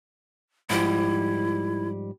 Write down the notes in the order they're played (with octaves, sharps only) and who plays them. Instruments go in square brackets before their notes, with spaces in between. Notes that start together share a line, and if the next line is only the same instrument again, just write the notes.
[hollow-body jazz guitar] G#2 F3 G3 [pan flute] E4